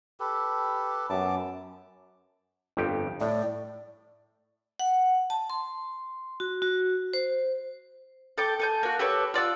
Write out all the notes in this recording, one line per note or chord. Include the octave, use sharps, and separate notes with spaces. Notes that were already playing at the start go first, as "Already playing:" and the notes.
G4 A4 B4
F#2 B3 A5 D6
G1 F2 G4
A2 D5
F#5
A5
C6
F#4
F#4
C5
A4 G5 D6
A4 G#5 G6
A#3 F#4
G4 A4 B4 C#5
F4 D5 F#5 E6